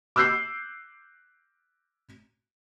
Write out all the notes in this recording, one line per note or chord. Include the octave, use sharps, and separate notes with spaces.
D6 E6 F#6 G6 C7